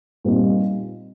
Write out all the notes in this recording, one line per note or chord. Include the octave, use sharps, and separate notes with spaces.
A#2 G3 C4 D#4